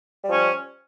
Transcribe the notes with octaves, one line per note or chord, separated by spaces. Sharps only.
F3 G3 C#4